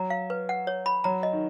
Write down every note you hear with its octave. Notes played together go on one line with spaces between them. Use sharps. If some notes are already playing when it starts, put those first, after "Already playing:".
Already playing: F#3 A#5
F5
B4
F#5
C#5
B5
F#3 A#5
D#5
D#3